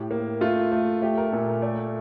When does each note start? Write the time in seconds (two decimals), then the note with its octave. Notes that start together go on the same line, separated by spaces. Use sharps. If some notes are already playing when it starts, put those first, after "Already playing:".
Already playing: A2 G4
0.11 A#3
0.41 A3 F4
0.72 A3
1.02 A3 G4
1.17 A#4
1.32 A#2 A4
1.48 A#4
1.62 A3 D5